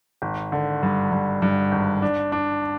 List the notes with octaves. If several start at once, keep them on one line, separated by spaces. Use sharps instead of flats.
G#1
D3
G2
G2
G2
G#1
D4
D4